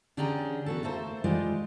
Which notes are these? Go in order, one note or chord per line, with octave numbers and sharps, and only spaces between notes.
D3 C#4 G4 G#4 D5 A#5
B3 F#4 A4
A3 A#3 A4 C5
G3 G#3 F4 G4